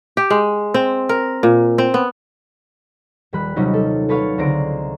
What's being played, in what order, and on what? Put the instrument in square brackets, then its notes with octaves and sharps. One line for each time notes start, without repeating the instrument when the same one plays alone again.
[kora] G4
G#3
C4
A#4
A#2
C4
B3
[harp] D#1 G3 B5 F#6
C3 F#3 G3 C#4 D#4 F4
A4
A4 B4 C#5 F5
C#2 D3 C4 A#5 D7